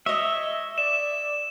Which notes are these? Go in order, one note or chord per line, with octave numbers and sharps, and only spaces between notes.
C#5 D#5 E5
D5 E7